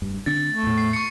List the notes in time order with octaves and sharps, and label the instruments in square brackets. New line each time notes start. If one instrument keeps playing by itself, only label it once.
[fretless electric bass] F1 G2
[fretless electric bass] D3 C4 D4 [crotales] A6
[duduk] A3
[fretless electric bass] E2 A2
[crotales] C7
C#6 C#7